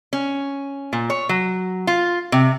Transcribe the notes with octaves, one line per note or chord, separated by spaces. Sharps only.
C#4
A#2
C#5
F#3
F4
C3